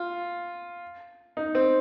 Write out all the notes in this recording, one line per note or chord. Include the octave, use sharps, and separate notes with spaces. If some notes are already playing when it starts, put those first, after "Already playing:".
Already playing: F4
D#4
C4